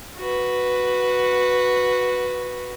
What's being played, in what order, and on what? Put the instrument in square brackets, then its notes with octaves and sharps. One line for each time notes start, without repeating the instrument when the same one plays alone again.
[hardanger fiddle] F#4 B4